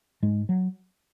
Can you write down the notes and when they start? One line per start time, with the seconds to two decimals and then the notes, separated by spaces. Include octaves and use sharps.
0.22 G#2 G#3
0.49 F#3